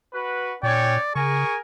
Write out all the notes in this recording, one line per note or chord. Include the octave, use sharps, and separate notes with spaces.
F#4 B4
A#2 C#4 C#5 D5 G5
C#3 G#4 A#4 G#5 C#6